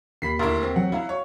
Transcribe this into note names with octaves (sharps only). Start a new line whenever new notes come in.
D#2 B5 B6 C7
D2 E4 A#4 C6
C4
F#3 F#5
F#3 E4 F5
C#5